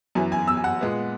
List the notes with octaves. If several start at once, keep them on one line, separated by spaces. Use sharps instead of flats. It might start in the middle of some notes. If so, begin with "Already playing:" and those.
F#2 E3 B3 G#5
G#5
E6
G#5
F#5
A#2 G#3 B3